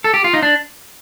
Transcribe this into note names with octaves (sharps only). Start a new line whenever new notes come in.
A4
G4
F4
D#4
D4